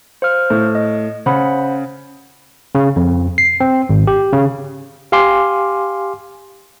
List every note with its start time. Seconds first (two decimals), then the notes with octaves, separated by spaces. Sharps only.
0.22 C5 F5 F6
0.50 A2
0.75 D#5
1.26 C#3 C5 F#5 B5
2.75 C#3
2.96 F2
3.38 C7
3.60 C4
3.89 G#1
4.07 G4
4.33 C#3
5.12 G4 F5 G#5 C6 D6